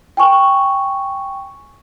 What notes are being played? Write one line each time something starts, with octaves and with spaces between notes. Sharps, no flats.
G5 G#5 C#6